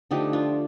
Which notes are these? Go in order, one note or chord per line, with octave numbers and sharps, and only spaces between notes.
D3 F3 A3 D#4 G4
D4 F4